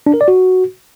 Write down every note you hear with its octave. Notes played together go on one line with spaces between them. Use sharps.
D4
A#4
D5
F#4